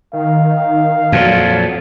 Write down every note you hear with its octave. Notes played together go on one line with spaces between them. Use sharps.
D#3 F5
F2 A#2 F#3